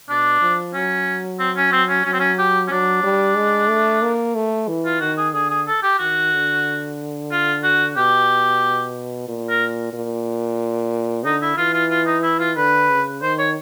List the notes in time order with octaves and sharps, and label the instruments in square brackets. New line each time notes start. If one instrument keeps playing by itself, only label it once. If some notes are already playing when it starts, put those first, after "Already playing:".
[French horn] B2 [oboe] D4
[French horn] F3
[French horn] F#3 [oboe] C#4
[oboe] C4
C#4
C4
C#4
[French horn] F#3 [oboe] C#4
[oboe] C4
C#4
G4
C#4
[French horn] F#3 [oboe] D4
[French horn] G3
G#3
A3
A#3
A3
E3
[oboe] F4
[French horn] D#3 [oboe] F#4
[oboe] G#4
[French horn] D3 [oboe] G#4
[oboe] G#4
A4
G4
[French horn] D#3 [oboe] F#4
[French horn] D3
[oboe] F4
F#4
[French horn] B2 [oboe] G4
[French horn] A#2
[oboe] A#4
[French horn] A#2
[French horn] D3 [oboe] D#4
[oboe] E4
[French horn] E3 [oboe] F4
[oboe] F4
F4
D#4
E4
F4
[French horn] D3 [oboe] B4
[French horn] C#3
[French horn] D#3 [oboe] C5
[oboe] C#5